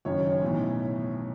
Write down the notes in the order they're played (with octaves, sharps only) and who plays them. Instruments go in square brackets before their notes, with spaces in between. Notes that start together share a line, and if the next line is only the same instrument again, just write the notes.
[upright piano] F#1 F#2 D#3 F#3 C#5
B1 A2 E3